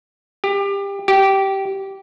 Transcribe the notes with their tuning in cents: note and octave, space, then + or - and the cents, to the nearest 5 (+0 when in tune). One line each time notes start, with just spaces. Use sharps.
G4 +25
G4 -15